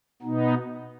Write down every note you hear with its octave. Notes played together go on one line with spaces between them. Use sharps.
B2 B3 D#4